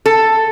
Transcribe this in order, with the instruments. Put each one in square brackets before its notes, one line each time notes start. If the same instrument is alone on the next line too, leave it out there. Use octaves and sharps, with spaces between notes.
[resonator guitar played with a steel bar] A4